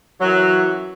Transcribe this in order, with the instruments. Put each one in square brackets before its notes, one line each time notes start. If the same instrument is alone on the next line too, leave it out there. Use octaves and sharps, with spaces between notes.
[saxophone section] F#2 E3 F#3